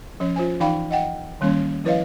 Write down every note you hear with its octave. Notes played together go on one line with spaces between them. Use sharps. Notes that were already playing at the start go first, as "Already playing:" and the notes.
F3 C#4 C#5
F4 C5 G#5
E3 D#4 D5 F5 G5 B5
D#5 F#5 G5
D#3 G3 A#3 C#4 C#5
F3 E4 B4 C#5 D#5 F5